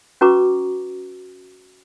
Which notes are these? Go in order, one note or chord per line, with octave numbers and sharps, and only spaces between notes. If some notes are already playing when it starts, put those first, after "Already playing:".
C#4 F#4 B4 A#5 C#6 D6